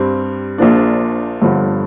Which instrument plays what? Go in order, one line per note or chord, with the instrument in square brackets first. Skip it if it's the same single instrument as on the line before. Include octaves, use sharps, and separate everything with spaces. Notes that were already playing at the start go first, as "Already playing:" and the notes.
Already playing: [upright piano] G2 G3 C4
A#1 A#2 F3 A#3 D4
G1 G2 D3 F3